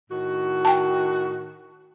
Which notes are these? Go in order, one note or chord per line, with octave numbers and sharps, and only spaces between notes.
A2 D#3 F#4
G5 A5